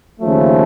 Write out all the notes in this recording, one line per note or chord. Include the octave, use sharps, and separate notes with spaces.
D#2 C#3 F3 A3